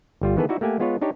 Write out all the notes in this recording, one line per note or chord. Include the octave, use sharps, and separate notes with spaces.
G1 G3 F4
D#3 E3 B3 G#4 A4 B4
D#4 E4 F#4 D5 E5
A3 A#3 G4 F#5 G#5
G#3 B3 F4 B4 C#5
D4 D#4 G4 C#5